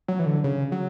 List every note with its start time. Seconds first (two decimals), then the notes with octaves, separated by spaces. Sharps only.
0.08 F#3
0.19 E3
0.26 D3
0.44 C#3
0.72 F#3